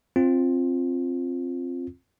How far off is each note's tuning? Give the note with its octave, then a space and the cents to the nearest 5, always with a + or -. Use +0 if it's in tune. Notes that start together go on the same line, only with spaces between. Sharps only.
C4 +15 F4 +0